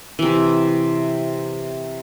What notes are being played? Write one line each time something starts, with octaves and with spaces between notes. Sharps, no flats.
C3 E3